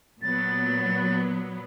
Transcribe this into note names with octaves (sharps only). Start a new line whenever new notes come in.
A#2 F#3 B3 A6